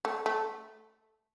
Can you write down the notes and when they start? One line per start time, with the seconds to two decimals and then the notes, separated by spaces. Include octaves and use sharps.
0.05 A3
0.26 A3